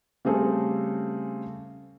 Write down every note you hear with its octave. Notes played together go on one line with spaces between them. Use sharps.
C#3 G3 A3 C4 G#4 A4